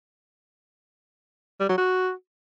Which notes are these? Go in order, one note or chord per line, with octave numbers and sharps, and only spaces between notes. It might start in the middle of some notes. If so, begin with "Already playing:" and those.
G3
F#3
F#4